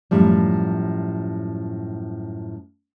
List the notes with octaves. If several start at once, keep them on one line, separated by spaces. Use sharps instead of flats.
F#2 A2 F3 G3